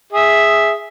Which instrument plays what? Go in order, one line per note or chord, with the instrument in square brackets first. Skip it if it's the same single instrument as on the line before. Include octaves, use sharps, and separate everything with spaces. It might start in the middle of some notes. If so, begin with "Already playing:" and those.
[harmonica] G#4 E5